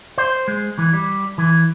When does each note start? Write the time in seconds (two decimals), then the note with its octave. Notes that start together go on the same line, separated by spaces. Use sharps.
0.18 C5
0.48 G#3
0.78 E3
0.93 G3
1.38 E3